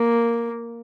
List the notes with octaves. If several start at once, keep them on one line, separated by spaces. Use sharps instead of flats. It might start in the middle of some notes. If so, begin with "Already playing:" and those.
Already playing: A#3